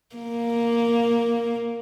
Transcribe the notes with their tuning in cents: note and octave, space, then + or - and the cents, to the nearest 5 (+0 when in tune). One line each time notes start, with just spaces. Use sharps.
A#3 +0